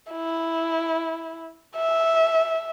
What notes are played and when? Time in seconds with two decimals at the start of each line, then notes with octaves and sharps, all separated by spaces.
0.12 E4
1.76 E5